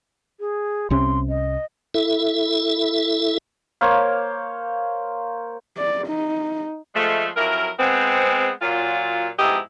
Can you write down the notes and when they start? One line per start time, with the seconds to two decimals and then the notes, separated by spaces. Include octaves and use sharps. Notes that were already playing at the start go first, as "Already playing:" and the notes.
0.40 G#4
0.90 C2 C3 C#4 C6
1.29 D#5
1.94 E4 A4 E5
3.81 A#3 C5 C#5 F5
5.77 D5
6.07 D#4
6.95 F3 G#3 A3
7.37 F2 F#3 E4 A#4
7.79 G#3 B3 C4
8.62 A#2 F#3 F4
9.39 F2 G#2 B3 E4 G4 D#5